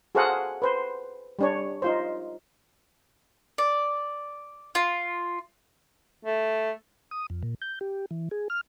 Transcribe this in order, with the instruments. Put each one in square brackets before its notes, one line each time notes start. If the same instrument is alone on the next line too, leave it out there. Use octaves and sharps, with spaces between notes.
[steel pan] F#4 G#4 A4 C5 F5 F#5
B4 C5
G3 D4 C#5
D#4 F4 C5
[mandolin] D5
F4
[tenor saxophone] A3
[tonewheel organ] D#6
F2
A#2
G6
G4
E3
G#4
F6